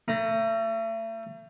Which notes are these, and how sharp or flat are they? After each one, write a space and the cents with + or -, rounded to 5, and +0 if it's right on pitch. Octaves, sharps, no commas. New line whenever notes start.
A3 +35 A#5 +0